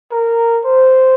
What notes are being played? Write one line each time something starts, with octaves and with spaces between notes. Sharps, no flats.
A#4
C5